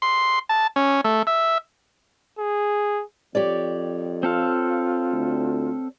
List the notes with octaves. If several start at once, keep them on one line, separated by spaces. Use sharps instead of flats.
C6
A5
C#4
A3
E5
G#4
F2 G4 C#5 D5
C4 F4 A4 F5
D2